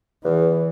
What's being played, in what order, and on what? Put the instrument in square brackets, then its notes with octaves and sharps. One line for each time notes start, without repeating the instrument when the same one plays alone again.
[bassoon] E2 [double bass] E3